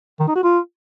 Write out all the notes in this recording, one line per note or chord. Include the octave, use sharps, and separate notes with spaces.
D#3
D#4
F#4
F4